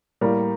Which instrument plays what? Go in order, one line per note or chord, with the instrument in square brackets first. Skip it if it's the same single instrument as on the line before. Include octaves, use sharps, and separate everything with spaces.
[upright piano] A2 G3 A#3 [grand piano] A#4